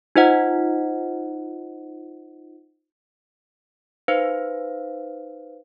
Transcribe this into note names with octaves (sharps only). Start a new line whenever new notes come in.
D#4 F4 C5 D#5 F#5
D#4 B4 C5 F5